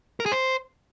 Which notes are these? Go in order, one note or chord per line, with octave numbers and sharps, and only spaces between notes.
A#4
G#4
C5